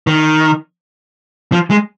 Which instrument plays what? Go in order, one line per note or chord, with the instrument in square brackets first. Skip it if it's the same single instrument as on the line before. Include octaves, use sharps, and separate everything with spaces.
[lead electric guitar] D#3
F3
G#3